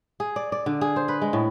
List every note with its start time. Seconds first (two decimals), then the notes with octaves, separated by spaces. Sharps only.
0.20 G#4
0.36 D5
0.52 D5
0.66 D3
0.81 G#4
0.96 C5
1.08 B4
1.22 G#3
1.33 A2